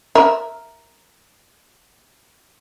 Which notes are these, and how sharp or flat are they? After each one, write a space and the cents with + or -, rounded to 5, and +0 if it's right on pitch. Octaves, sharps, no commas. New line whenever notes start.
A#4 +0 E5 -5